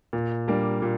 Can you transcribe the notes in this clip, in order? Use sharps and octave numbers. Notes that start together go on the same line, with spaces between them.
A#2
G3 A#3 D4
A#2